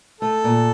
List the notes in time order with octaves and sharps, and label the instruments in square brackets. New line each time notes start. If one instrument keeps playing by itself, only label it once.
[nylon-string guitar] A3 [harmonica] A4
[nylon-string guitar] A#2